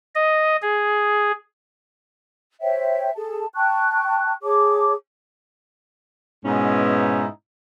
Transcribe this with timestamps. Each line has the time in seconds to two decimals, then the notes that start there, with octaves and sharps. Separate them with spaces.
0.15 D#5
0.62 G#4
2.61 C5 C#5 E5 G5
3.16 G#4 A4 A5
3.55 G5 A5 C#6 F#6
4.43 G#4 C#5 A5 D6
6.45 G#2 B2 B3 C#4 D#4 E4